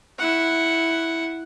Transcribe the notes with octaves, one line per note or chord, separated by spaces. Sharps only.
E4 F#5